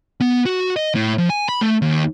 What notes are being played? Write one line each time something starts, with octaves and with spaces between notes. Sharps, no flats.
B3
F#4
D#5
A2
F3
G#5
B5
A3
D#2